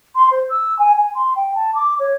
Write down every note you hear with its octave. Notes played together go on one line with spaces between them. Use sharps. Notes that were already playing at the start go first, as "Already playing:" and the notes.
C6
C5
E6
G#5
G#5
C6
G5
A5
D6
C#5